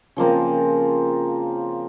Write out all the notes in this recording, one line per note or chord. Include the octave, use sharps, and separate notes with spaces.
C#3 F3 A#3 C4